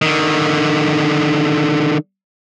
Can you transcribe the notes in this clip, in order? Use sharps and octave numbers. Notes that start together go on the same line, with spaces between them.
D3 D#3